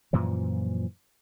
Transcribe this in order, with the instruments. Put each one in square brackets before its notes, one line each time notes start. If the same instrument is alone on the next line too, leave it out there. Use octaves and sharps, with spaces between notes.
[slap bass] F#2 A#2 E3 F3